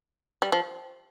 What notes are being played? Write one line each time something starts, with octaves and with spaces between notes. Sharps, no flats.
G3
F3